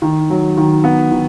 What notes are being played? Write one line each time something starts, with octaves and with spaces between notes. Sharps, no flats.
D#3
F#3
D#3
B3
D#3